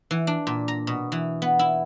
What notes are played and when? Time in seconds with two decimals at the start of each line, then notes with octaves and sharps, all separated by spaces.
0.11 E3
0.27 D4
0.47 A#2
0.68 A#5
0.87 B2
1.12 E3
1.42 B3
1.59 E4